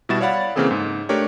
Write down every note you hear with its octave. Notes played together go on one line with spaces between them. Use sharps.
B2 G3 E4 F#4 A6 E7
C#5 D5 F5 F#5 B5
C#3 E3 A#3 C4 G#4 A4
G#2
A3 D4 G4 A#4 C#5